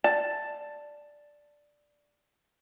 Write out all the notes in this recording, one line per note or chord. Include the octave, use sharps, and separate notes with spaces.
D5 A5